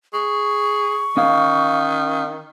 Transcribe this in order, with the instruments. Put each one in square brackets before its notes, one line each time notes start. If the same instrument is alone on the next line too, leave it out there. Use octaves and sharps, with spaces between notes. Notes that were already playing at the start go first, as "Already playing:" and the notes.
[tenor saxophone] G#4 [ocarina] C#6
[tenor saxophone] D#3 [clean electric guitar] C#4 F5